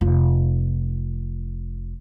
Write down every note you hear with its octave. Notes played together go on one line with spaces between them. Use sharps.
F1 F4